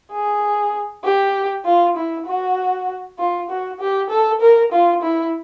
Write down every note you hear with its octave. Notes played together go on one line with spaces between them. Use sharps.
G#4
G4
F4
E4
F#4
F4
F#4
G4
A4
A#4
F4
E4